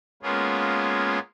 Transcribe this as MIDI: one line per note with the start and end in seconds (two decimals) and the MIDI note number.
0.23 1.19 56
0.23 1.19 58
0.23 1.19 59
0.23 1.19 61
0.23 1.19 65
0.23 1.19 68